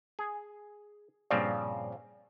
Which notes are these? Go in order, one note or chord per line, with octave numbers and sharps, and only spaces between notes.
G#4
G2 A#2 C#3 F3 C4 D5